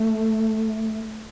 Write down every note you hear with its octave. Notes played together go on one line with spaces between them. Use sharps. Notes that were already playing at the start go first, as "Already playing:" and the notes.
Already playing: A3